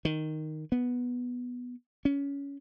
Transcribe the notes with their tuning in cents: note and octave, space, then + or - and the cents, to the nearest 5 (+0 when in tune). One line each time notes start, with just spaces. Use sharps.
D#3 -5
B3 -5
C#4 +20